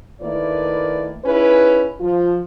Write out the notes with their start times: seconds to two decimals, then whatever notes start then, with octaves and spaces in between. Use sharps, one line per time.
0.21 D#3 A3 A#3 E4 B4 D5
1.25 C#4 D#4 E4 G#4 B4
2.00 F3 F4